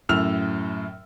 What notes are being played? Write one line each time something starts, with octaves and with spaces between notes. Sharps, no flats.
F#2 A2 E6 F6 F7